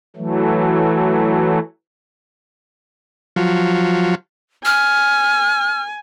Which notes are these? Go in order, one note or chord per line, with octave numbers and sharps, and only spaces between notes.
E3 F#3 A3
F3 F#3
G#5 F6